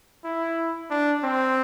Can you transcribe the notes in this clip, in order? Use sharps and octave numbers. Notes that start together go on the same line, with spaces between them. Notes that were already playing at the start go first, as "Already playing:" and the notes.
E4
D4
C4